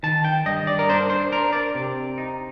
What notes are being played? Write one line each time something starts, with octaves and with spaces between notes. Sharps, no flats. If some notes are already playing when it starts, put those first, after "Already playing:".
D#3 A5
G5
G2 D#5
D5
A#4
D4 C5
C5
D4 A#4
D5
C3
D#4